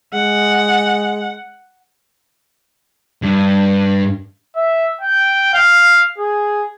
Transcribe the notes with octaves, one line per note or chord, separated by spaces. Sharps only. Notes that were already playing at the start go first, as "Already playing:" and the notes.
G#3 F#5
G2
E5
G5
F5
G#4